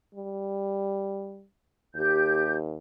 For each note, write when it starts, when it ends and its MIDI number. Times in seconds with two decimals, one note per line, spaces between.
0.14 1.44 55
1.95 2.78 39
1.95 2.55 67
1.95 2.55 91